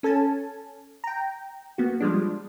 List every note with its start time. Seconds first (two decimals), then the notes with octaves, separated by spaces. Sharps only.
0.03 C#4 A4 G#5 A5
1.04 G5 A#5
1.78 A#3 B3 F#4
2.00 F3 G3 G#3 D4